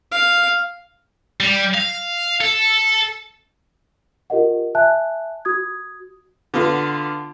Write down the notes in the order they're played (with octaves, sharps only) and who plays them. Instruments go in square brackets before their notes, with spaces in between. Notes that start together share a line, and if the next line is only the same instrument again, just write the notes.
[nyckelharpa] F5
[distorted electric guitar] G3
F5
A4
[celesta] F4 G4 A#4 D#5 F#5
E5 G#5 A5 F#6
F#4 D#6 G#6
[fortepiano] D3 B3 F4